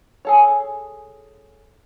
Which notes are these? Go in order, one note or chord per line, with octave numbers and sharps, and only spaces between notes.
G#4 A4 C#5